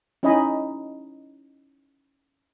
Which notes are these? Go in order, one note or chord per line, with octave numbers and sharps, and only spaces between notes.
C#4 D#4 E4 D#5 G#5 B5